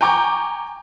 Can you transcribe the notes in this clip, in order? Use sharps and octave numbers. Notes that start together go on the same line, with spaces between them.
G5 G#5 A#5 C#6 D6 G6